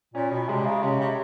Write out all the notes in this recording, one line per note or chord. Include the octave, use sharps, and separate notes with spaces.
A#2 C#4
B2
C3 G#3
C#3
C3 C#4
C3